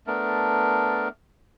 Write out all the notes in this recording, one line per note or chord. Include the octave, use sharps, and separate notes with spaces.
A3 B3 D4 A#4